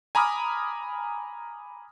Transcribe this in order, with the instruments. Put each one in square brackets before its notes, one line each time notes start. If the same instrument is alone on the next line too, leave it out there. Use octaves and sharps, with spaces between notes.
[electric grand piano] G#5 A#5 B5 D6 D#6 F6